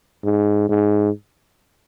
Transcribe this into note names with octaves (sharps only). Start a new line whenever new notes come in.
G#2
G#2